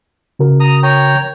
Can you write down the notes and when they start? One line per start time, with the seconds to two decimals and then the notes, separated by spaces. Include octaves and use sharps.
0.39 C#3 F#4 A#4
0.60 A#5 D#6
0.83 C#5 G5 A#5